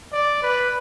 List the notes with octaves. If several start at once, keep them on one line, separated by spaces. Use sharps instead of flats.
D5
B4